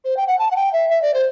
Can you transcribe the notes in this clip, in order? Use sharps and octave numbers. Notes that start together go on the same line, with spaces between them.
C5
G5
F#5
A5
F#5
G5
E5
E5
D5
C5